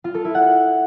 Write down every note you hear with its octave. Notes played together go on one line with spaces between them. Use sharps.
F4
A4
E4
F#5